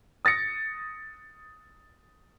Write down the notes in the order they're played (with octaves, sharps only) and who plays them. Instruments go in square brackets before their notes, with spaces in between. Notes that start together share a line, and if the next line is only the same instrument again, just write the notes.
[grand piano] D#6 A6 A#6 C#7